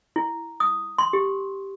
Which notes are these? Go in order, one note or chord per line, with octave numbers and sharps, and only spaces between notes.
E4
D#6
C6
G4